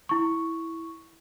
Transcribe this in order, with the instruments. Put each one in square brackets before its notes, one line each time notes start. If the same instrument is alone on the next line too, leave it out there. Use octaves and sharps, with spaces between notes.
[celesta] E4 C#6